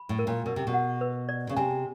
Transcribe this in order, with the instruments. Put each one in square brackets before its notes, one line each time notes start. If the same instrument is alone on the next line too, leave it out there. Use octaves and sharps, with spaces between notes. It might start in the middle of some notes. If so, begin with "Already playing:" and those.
Already playing: [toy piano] B5
[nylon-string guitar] A2
[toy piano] A#4
[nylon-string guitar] A#2
[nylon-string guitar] B2 [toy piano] A#4
[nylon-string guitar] C3
B2
[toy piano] F#5
B4
D5
[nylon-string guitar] C#3
[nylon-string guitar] C3 [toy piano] G#5